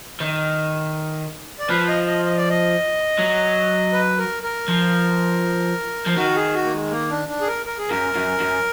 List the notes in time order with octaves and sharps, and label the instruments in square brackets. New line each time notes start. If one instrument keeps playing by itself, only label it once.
[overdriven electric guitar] D#3
[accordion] D5
[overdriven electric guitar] F3 [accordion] B4
[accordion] D#5
D#5
D#5
D5
D#5
[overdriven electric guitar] F#3
[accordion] B4
A#4
A#4
[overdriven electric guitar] F3
F3
[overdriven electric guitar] D#3 [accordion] F#4
[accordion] G#4
F#4
A#3
G#3
A#3
D4
D4
G#4
A#4
A#4
G#4
[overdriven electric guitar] F#2 [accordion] A#4
[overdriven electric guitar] F#2
F#2